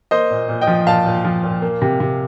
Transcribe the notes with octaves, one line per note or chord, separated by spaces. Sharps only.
A#3 C5 D#5
A#2
A#2
D#5 G5
F3
A#2 F5 A5
A#2
F3
A#2
A#3
C3
C3